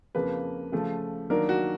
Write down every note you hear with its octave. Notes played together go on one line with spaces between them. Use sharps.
F2 C#3 F3 A#3 B4
C#3 F3 A3
D#3 F#3 A#3 D4 A#4
F#4